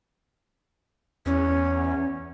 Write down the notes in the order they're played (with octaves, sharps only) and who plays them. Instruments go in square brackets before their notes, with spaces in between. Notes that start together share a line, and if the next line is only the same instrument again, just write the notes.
[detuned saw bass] E2 [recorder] C#4